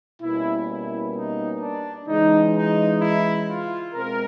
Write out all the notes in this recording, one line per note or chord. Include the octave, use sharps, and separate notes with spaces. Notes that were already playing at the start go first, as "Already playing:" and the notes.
B2 G3 A#3 C#4 E4
E4
D#4
D4
C#3 E3 G#3 D#4
D#4
E4
F4
B2 G#3 C4 A#4